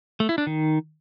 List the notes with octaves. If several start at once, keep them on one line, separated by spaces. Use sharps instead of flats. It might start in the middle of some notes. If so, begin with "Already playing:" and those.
A3
E4
D4
D#3